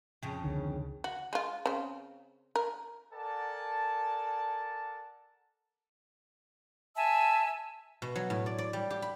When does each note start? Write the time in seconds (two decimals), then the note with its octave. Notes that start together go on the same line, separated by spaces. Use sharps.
0.23 F2 C#3
0.44 C#2 D3 D#3
1.04 F#4
1.33 G#3 F4
1.66 C#3 C4
2.56 A#4
3.13 A4 A#4 D5 F#5 G#5 A5
6.95 E5 G#5 A5 E6
8.02 B2
8.15 F#3
8.30 A2
8.46 D5
8.58 D5
8.73 G3
8.90 G4
9.02 B5